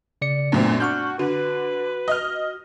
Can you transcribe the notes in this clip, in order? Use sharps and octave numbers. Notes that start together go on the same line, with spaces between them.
C#3 D5 C#7
F#2 A#2 A3 B3 C4 D4
D4 F#4 C#6 F6 G6
D3 F#4 B4
D#5 F6